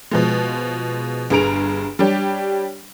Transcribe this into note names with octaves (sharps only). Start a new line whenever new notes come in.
B2 F3 G#3
G1 G2 G#4 A#5 D7 F7
G3 D4 G4 C#5